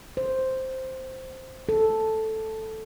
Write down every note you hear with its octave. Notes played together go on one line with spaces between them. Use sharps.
C5
A4